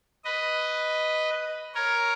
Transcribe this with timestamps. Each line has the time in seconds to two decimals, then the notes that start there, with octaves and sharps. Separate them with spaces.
0.25 B4 D#5
1.75 A#4 C#5